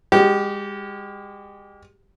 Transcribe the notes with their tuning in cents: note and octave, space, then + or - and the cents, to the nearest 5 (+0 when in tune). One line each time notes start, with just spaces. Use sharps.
G#3 -40 G4 -25